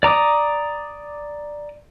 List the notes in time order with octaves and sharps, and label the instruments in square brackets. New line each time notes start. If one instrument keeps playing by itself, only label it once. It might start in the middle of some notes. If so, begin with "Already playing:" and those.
[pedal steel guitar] D5 A#5 D6 D#6